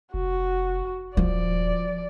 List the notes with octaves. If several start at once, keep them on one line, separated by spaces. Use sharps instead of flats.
F1 F#4
D#1 F3 D5